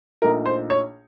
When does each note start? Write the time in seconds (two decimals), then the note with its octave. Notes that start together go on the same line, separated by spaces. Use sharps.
0.22 A#1 A#2 A3 D#4 A#4
0.46 C5
0.70 C#5